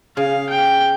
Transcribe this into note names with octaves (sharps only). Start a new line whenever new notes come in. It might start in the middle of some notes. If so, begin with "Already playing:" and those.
C#3 F5
G5